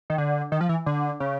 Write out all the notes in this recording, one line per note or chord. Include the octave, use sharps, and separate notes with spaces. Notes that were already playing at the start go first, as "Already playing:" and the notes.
D#3
D3
D#3
F3
E3
D3
C#3